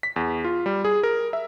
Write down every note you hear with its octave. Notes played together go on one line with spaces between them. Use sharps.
B6
E2
F4
G3
G#4
A#4
E5